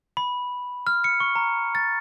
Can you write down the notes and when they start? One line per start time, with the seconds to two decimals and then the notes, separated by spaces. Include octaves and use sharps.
0.17 B5
0.87 F6
1.04 C#7
1.20 C#6
1.35 A#5
1.75 A6